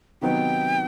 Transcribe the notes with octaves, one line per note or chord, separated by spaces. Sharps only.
C3 D#3 F#3 B3 D#4 G5